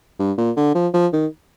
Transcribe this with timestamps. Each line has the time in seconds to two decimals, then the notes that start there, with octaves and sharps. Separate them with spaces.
0.19 G2
0.38 A#2
0.56 D3
0.75 F3
0.94 F3
1.13 D#3